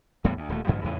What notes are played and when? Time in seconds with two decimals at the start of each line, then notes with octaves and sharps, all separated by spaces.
0.24 E2 A2 G3 B3
0.37 D2
0.49 D#1 D#2 A3
0.67 A1 G2 D3 F#3
0.84 E2 A2 C#3 E3